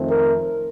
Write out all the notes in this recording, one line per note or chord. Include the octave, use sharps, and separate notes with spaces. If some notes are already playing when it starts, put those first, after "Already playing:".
Already playing: F2 D#3 A3 C4
A#4